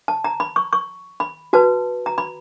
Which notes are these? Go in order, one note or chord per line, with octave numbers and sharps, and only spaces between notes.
A5
A#5
B5
C#6
C#6
B5
F#4 B4 A5
A#5
B5